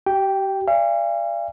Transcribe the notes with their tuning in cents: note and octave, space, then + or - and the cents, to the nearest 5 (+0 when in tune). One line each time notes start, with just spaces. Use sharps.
G4 -35 G5 +0
D5 +0 F5 -45 G#5 -40